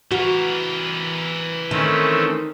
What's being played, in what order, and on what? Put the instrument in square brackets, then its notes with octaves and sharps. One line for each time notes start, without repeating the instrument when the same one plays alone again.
[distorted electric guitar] E3 A#4 [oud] F#4
[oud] D#3 [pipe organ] A3 C4 C#4